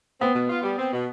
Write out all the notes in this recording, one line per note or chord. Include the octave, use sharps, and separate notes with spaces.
B3 C4
B2
F4
G3
C4
B2